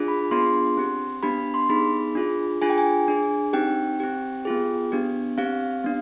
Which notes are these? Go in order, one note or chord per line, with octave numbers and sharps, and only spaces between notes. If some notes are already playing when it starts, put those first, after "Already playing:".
Already playing: D4 F4 G#4
B5
B3 D4 F4 G#4 C6
C4 G4
B3 D4 G4 B5
C6
B3 D#4 G#4 B5
D4 F4 G#4
D4 F4 G#4 G#5
G5
G#5
D4 G#4
C4 D#4 G4 G5
C4 G4
B3 F4 G#4
B3 D4 G4
C4 G4 F5
B3 D4